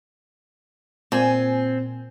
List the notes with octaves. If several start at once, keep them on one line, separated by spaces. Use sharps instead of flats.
A#2 C4 G#5